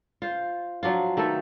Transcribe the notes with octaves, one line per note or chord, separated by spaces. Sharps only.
F4 C5
F3 F#3 D4 F4
D#3 A3 B3 A4